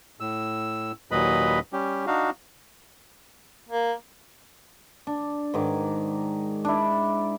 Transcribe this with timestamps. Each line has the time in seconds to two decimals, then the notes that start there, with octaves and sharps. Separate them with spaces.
0.20 A2 E6
1.11 D#2 A#2 F#3 B4 D#5 B5
1.73 G3 C#4 G4
2.07 D4 D#4 F#4 F5
3.69 A#3
5.07 D4
5.54 G#2 D#3 D6
6.65 D4 E4